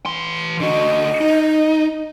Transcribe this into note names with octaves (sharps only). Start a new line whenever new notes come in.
E3 C6
D3 F#4 D#5
D#4